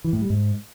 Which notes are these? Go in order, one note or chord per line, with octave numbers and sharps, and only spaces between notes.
E3
A2
G3
G#2